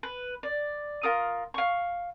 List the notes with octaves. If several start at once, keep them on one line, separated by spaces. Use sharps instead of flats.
B4
D5
F4 A#4 D#6
F5 C#6